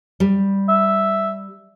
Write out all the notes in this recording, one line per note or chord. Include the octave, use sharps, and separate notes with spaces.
G3
E5